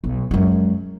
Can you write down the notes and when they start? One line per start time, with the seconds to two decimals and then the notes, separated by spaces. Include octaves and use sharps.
0.04 B1
0.31 F#2 G#3